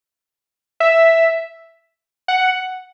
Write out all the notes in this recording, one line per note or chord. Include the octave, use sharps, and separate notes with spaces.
E5
F#5